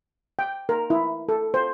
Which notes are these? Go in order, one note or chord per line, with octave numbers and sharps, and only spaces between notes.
G5
A#4
E4
A4
C5